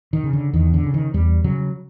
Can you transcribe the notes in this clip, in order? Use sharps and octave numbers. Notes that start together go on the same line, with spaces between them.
D#3
C#3
D3
E2 D#3
D3
C#3
D#3
E2 G3
C#3 F#3